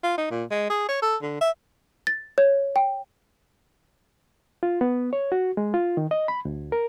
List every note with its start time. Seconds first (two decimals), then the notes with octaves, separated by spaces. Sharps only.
0.03 F4
0.18 D#4
0.30 A#2
0.51 G#3
0.70 G#4
0.89 C#5
1.02 A4
1.22 D3
1.41 E5
2.07 A6
2.38 C#5
2.76 G5
4.63 F4
4.81 B3
5.13 C#5
5.32 F#4
5.57 G#3
5.74 F4
5.97 D#3
6.11 D#5
6.28 B5
6.45 D2
6.72 A#4